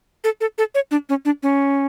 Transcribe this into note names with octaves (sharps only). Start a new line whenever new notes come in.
A4
A4
A4
C#5
D4
C#4
D4
C#4